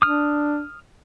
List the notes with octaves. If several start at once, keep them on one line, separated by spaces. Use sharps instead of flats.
D4 D#6 F6